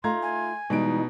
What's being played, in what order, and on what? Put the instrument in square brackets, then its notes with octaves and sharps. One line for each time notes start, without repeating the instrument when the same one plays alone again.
[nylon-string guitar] A3 D#4 F4 [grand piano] F5 A#5 G#6 [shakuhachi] C6
[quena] G#5
[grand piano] B2 D7 [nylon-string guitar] E3 G3 G#3 [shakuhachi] D#4